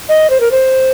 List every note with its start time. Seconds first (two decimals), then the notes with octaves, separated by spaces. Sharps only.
0.09 D#5
0.30 C5
0.40 A#4
0.51 C5